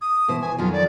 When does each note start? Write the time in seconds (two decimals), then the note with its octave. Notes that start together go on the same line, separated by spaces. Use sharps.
0.01 D#6
0.28 B2 E3 C5
0.41 G#5
0.58 F2 D#3 F#3 F4
0.72 D5